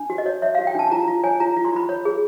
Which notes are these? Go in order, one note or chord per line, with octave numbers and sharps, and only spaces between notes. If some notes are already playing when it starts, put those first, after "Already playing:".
Already playing: D4
F#4
D#5
C#5
C#5 E5
F5
F#4
G5
D4 A5
A5
F4 A#5
F4
C#5 G#5
F4 A#5
F4
C6
F4 B5
C#5
G#4